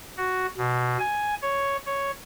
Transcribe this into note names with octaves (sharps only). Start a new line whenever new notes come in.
F#4
B2
G#5
C#5
C#5